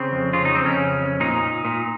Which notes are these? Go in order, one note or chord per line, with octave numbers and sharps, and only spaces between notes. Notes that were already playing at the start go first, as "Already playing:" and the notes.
Already playing: C#3 C4
F2
C#3 F4
D#4
F2 C4
C#4
C#3
F2
A#2 D#4
A#2
A#2